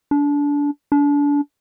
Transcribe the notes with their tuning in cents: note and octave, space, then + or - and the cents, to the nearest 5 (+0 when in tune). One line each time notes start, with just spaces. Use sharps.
D4 -25
D4 -30